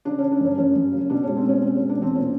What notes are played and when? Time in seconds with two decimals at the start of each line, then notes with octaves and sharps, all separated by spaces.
0.05 C#3 D4
0.19 C#3 C#4
0.32 D4
0.40 F#2 C#4
0.58 F#2 C#4
0.76 F#2
0.92 C#3
1.10 B2 D4
1.23 G#3 C#4
1.37 C4
1.45 B2 C#4
1.62 G#3 C4
1.76 B2 C#4
1.89 D4
1.98 E2 C4
2.15 A#2 C#4